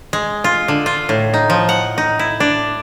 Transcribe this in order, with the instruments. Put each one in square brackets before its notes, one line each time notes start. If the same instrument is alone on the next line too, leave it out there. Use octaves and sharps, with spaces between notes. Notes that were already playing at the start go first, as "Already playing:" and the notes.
[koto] G#3
F4
D3
F4
A2
D#4
F3
F#5
D#4
E4
D4